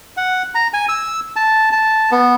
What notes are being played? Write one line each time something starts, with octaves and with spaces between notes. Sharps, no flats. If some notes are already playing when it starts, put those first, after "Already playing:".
F#5
A#5
G#5
E6
A5
A5
B3